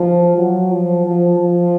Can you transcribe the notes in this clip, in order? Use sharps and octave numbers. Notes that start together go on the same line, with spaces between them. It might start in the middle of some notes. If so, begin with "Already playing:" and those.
Already playing: F3
F#3
F3
F3
F3